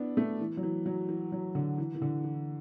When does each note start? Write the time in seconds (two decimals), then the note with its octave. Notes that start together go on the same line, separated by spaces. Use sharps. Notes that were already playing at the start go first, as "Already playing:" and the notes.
Already playing: B3 D4 E4
0.17 A3
0.40 E3
0.57 F#3
0.63 E3
0.86 F#3
1.09 E3
1.32 F#3
1.55 D3
1.78 E3
1.95 E3
2.02 D3
2.24 E3